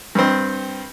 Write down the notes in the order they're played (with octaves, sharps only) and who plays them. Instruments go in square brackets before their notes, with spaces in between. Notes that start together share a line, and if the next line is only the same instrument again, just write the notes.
[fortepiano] G2 C4